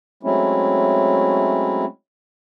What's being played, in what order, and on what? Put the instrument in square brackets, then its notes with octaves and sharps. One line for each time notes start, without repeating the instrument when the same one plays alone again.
[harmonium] F#3 G#3 A3 C4 C#4 E4